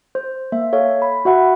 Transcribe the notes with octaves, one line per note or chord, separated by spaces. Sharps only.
C5
A#3 E5
A4 C#5 F5
B5
F#4 E5 F#5 B5